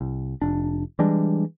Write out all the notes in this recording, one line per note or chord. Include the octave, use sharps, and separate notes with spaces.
C2
F1 D4
E3 G3 G#3 D4